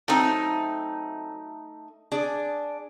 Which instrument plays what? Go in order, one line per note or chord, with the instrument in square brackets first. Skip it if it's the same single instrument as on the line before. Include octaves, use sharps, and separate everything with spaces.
[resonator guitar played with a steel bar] F#3 C4 [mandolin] A3 D#4
[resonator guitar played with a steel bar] D4 G#4 D5